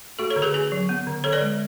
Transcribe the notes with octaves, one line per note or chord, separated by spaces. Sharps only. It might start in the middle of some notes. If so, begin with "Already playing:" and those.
A3 F#4 A4
A4 C#5
D3
G#4 B4
C#4 G#4 B4
F#3
B3
D3
D3 A4 C#5
B4 D5
G#3